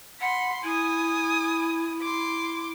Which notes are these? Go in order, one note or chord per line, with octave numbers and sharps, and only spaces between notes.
F#5 B5 C6
E4 G#5 D#6
C6 D6